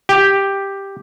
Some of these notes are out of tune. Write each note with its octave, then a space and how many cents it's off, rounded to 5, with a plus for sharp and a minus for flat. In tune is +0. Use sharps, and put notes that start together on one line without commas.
G4 +5